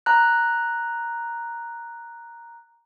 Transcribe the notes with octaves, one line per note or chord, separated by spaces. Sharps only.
A#5 F#6